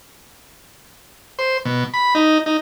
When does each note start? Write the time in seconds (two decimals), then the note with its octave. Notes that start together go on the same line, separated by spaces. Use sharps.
1.39 C5
1.65 B2
1.94 B5
2.15 D#4
2.46 D#4